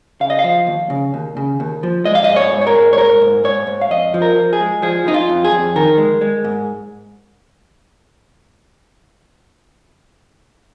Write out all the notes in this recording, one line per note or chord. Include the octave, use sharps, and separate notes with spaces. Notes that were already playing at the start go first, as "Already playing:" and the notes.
C#3 F5
D#5
F5
F3
D#2
C#3
D#2
C#3
D#2
F3
G#3 D#5
F5
G#2 D#5
C#5
G#2
C#5
A#4
G#3
C#5
G#2 A#4
G#2
G#2 C#5
G#2
F5
F2 D#5
F3
A#4
F3
G#4
G#3
F3 G#4
F3 D#4
F4
F2
G#4
F2
D#3 A#4
G#3
G#3
G#2